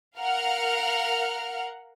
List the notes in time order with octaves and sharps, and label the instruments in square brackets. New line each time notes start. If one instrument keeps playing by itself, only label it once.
[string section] A#4 F5 F#5 F6